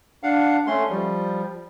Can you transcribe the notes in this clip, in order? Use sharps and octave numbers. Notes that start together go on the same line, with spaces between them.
D4 F5 F#5
A3 C#4 C6
F3 G3